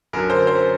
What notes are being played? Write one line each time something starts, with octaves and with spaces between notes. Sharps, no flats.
F#2 D3 F#3 A#4
C5
C5